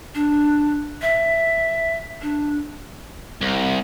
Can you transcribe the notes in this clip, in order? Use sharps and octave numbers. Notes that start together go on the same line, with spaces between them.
D4
E5
D4
C2